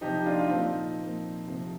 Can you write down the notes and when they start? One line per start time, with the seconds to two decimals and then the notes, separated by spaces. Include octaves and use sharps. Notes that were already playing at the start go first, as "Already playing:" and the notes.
0.01 C3 F3 D#4 G4
0.26 D4 F4
0.39 F4
0.50 A#2 F3 C4 D#4
0.99 A#2 F3
1.47 C3 F3